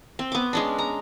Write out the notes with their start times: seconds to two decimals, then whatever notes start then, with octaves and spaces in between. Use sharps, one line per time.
0.19 C4
0.32 B3 D6
0.53 G#3 C#4 D4
0.79 A#5